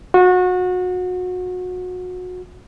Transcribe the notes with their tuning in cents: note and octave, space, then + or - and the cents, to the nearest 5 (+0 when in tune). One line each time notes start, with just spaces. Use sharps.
F#4 -30